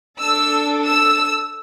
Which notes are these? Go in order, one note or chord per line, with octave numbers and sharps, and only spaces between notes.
D4 A4 E6
E6